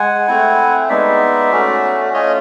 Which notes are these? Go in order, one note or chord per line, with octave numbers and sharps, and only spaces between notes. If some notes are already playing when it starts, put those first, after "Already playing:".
Already playing: G#3 F#5 G#5
A3 C4 E4
G#3 B3 D#4 D5 E5
A3 C#4 F#4
A3 C#4 F4 C#5 D#5